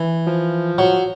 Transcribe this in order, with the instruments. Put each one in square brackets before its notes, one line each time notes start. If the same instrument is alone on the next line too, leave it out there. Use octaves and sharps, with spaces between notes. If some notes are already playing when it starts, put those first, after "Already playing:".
Already playing: [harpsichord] E3
[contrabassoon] F3
[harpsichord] F#3